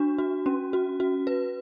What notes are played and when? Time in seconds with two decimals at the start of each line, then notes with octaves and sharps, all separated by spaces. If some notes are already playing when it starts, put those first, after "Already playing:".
Already playing: D4 F#4
0.18 F#4
0.46 C#4
0.73 F#4
1.00 F#4
1.27 B4